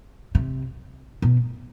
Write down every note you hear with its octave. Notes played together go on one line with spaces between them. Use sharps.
C3
B2